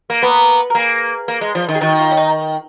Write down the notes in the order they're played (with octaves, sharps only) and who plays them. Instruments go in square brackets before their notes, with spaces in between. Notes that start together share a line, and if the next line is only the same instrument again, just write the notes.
[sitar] A#3
[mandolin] A#3 A#4 [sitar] B3
[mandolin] A#4
[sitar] A#3 [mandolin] G#4
[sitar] A#3
G#3
F3
D#3
[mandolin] G#4
[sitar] D#3 [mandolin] F#4
[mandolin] F4
C#4
D#4